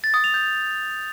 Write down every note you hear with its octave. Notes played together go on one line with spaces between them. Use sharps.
A6
D#6
F7
G6